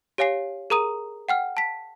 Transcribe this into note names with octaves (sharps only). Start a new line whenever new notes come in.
G4 C#5 F5 G#5 C7
G#4 A#4 A#5 D#6 D#7
F#5 G5 F6
A5 B6